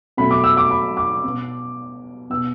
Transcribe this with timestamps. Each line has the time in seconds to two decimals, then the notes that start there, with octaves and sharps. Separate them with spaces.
0.17 B2 F#3 A3 B5
0.31 D6
0.44 E6
0.57 D6
0.71 B5
0.97 D6
1.24 B2 B3
2.30 B2 B3 E6